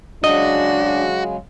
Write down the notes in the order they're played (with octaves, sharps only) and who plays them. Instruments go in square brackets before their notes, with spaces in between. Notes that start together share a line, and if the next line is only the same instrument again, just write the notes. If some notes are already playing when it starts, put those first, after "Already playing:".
[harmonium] C#3 F#3 G#3 [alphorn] D4 [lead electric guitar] F#4 [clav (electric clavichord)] D#5